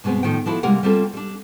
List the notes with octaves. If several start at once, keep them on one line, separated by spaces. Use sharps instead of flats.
G2 B2 G#3 B3 C4
A2 D#3 F3 G5
F3 D4 E4 F#4 A4
C3 G3 G#3 A#3 A#4 F#5
G3 A#3 C4 F4 A4
G3 D4